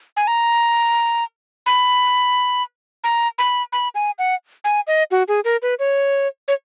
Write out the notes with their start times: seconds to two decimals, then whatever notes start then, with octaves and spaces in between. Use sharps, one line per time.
0.17 G#5
0.27 A#5
1.66 B5
3.04 A#5
3.38 B5
3.73 B5
3.95 G#5
4.19 F#5
4.64 G#5
4.87 D#5
5.11 F#4
5.28 G#4
5.45 A#4
5.62 B4
5.79 C#5
6.48 C#5